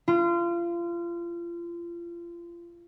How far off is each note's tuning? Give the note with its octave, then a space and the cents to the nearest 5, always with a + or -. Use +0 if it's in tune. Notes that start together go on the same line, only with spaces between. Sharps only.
F4 -30